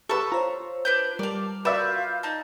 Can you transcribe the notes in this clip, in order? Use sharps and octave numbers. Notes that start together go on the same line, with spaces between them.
G4 A4 B4 C#6 E6
F4 C5 C#5 A#5
D4 B4 G6
G3 A#4 D5 F5 A5 D6
F4 F#4 B4 D5 E5 F5 G6
D#4 A5